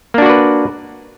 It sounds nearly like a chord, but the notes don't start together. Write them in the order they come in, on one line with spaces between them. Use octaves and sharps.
A#3 D4 F#4 D5 B4